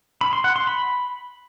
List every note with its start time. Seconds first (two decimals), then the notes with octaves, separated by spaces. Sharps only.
0.21 B5
0.33 C6
0.44 F#5
0.56 C6
0.67 B5